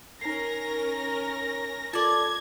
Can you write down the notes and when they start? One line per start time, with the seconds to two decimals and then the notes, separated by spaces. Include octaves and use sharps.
0.21 C#4 D#4 A#4 A#6 C7
1.93 F4 A4 D5 A5 G#6